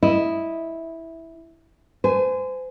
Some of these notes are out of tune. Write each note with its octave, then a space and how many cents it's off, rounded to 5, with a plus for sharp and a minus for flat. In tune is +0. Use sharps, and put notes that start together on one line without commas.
E4 -5 D#5 +0
C5 -35 G#5 +0